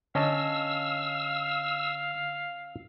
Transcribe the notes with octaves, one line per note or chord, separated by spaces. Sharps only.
D3 C#4 D#5 F5 A5 E6